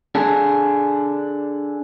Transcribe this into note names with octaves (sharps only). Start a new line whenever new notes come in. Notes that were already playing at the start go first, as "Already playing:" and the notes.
D4 G#4 A4